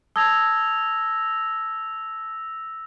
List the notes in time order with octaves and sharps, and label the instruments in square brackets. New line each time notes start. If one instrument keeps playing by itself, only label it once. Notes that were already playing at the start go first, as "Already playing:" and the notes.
[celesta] A5 D#6 G#6 [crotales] E6 A#6 F7